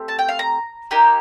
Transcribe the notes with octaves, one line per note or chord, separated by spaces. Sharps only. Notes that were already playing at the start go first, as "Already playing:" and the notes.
Already playing: A3 C4 G4
A5
G5
F5
A#5
A#3 D#4 G4